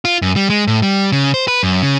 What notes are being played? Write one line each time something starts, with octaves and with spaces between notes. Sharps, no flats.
F4
F#2
G3
G#3
A2
G3
C#3
C5
B4
F#2
C#3